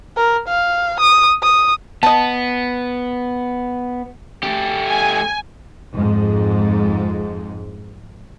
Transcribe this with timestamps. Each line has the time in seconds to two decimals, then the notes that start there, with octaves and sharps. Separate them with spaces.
0.17 A#4
0.48 F5
1.00 D#6
1.43 D#6
2.03 B3 D#5 A5
4.43 A3 G4
4.87 G#5
5.93 F2 G#2 G#3